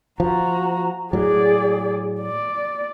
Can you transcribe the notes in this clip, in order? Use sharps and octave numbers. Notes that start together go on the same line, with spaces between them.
F3 F#4 A#5
A2 F#3 G#4 D5
D5